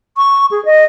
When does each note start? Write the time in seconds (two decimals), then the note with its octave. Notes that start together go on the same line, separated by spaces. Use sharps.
0.17 C#6
0.51 G#4
0.65 D#5